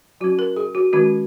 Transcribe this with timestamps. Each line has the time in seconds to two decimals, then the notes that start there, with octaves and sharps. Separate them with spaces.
0.20 F#3 F#4
0.24 C#4
0.39 A#4
0.56 G#4
0.75 F#4
0.93 D#3 G#3 C#4 F#4